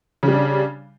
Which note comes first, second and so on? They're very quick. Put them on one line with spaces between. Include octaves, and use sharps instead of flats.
C#3 G3 D4